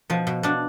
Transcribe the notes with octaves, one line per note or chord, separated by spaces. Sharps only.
B2 F3
B2
B2 D4